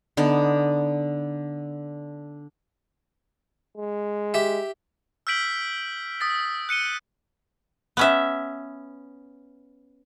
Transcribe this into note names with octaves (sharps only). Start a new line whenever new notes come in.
D3 B3 D4 D#4
G#3
G4 E5
E6 F6 G6 B6 D7 F#7
D#6 A6 B6
F#6 C#7 D#7 G7
B3 C#4 E5